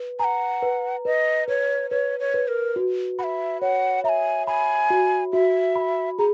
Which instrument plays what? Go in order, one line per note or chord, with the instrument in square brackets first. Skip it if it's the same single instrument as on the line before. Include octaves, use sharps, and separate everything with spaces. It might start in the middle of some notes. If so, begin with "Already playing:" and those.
Already playing: [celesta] B4
[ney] F#5 G#5 [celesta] A#5
[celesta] B4
[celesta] B4 [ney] D#5
[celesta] B4 [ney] C#5
[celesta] B4 [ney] C#5
[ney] C#5
[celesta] B4
[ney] A#4
[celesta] F#4
[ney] F#5 [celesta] B5
[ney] E5
[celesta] C#5 [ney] F#5
[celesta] E5 [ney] A#5
[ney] G#5
[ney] G#5 [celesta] B5
[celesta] F#4
[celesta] F#4 [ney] E5
[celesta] B5
[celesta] G#4 [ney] A#5